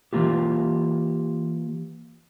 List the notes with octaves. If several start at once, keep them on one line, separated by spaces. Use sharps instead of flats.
E3 F3 A#3 F4 G4